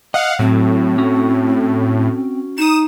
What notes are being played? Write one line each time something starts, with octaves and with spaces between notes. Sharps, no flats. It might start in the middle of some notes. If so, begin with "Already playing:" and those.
D#5 F5 F#5
A2 F#3 C4
C#4 F#4
D#4 D#6 E7